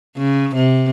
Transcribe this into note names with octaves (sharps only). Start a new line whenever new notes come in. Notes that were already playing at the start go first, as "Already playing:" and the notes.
C#3
C3